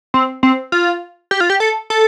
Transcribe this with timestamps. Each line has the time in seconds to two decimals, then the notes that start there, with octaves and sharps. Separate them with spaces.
0.14 C4
0.43 C4
0.72 F4
1.31 G4
1.40 F4
1.50 G4
1.60 A4
1.90 A4